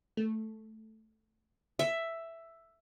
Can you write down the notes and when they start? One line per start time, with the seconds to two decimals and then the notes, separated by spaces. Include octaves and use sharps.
0.17 A3
1.79 E5